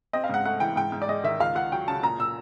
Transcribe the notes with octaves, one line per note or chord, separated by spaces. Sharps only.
C4 D#5
F5
G#2 F#5
A3 F#5
E3 G5
G#2 G5
G#2
D5
G#3 D#5
D#3 E5
C#2 F5
C#2 F#5
F#3 G5
C#3 A5
A#2 A#5
A#2 E6